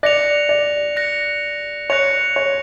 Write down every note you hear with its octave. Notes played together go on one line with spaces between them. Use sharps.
D5 F#6 A#6 C#7 F7
D5
F#6 A#6 C#7 F7
C#5 F#6 A#6 C#7 F7
C#5